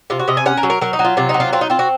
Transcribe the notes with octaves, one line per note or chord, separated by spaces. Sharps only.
C3 F4
F#4
C3 D#5
G#5
C#4 F#5
A#4
F#3
A#4
F#3 A#4
D#4
F#3
F4
C3 F4
D#4
F#3
F4
C4 F4
D#4
C4 F4
F#4